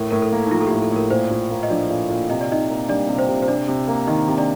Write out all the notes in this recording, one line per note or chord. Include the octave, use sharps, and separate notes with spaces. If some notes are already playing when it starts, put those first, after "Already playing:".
Already playing: A2 A#4
A2 A#4
A4
A#3
D#4
F3 F4
A4
A2 G4
A4
A2 A#4
A#2 C5
A#2
A#3
D#5
F3 D4 D5
A#2
A#2
C3 D#5
D5
C3 D#4 D#5
A#3
G3 D4 D5
C3
C5
C3
C5
C3 D4 D5
C3
A#3
D#3 D#4 D#5
C3
D4 D5